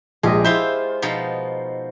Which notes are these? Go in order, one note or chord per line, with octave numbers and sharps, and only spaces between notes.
A#1 G#3 G4 G#4 D#5
E4 F4 C5 E5 G6
B2 F3 D#4